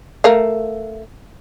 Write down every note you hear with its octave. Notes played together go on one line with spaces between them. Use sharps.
A3 A#4 F5